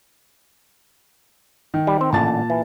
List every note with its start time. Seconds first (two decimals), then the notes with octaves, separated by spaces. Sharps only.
1.74 D#3
1.87 G3
2.01 C4
2.13 A1 A#2 D3 A5 A6
2.50 E3